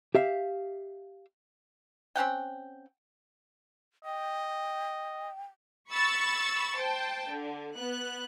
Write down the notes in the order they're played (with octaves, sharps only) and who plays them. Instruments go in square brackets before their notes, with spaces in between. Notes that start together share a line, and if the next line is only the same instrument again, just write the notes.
[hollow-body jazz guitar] G4 E5 F5
[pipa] C4 C#4 F#5 G5
[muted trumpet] D#5 [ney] G5
[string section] B5 C#6 E6 A6 C#7
C5 G5 A5
D3
B3 F#6